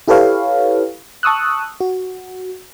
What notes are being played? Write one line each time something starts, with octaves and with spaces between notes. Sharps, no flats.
E4 G4 A4 B4 C#5 F5
A5 C#6 D#6 E6 F#6
F#4